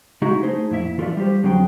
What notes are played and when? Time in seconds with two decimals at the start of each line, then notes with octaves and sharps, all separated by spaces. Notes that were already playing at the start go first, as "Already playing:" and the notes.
0.22 C#3 G#3 D#4 E4 F#4 G#4
0.43 A3 D#4 G#4 C5
0.70 F2 A#2 E4 E5
0.98 E3 F4 A4 A#4 D5 E5
1.17 G3 F4 G4 C5
1.43 F2 D3 F#3 C4 G#4 G5